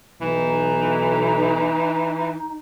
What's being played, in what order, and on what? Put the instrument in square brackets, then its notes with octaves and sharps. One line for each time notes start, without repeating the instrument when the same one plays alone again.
[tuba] B1 [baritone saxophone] E3 [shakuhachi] D#4